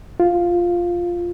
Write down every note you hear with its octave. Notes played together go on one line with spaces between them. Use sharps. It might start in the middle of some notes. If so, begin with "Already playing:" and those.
F4